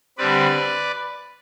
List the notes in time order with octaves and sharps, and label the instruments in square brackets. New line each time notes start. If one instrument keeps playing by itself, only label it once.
[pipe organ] D3 G3 C4 B4 D5